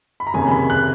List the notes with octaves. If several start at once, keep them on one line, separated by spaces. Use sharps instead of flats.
B5
A#5
F1 D#2 C#3 G#5
B5
F#6